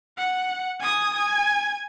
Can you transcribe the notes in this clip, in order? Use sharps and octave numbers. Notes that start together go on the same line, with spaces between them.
F#5
G#5 D#6
G#5